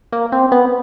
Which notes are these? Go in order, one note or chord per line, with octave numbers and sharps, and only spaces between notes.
A#3
C4
B3